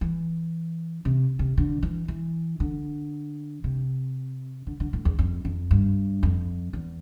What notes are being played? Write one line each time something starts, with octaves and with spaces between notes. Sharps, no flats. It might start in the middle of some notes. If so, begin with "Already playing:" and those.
E3
C3
C3
D3
E3
E3
D3
C3
D3
D3
A2
E2
F2
F2
G2
F2
E2